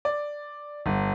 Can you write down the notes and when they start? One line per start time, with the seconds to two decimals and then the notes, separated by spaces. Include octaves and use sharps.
0.05 D5
0.86 G1